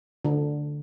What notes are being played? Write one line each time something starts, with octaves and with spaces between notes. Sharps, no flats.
D3